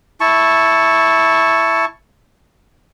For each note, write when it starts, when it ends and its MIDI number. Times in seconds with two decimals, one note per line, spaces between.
0.21 1.85 64
0.21 1.85 81
0.21 1.85 85